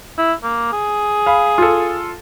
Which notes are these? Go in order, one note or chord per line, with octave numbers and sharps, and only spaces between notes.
E4
A#3
G#4
F5 B5
F4 A4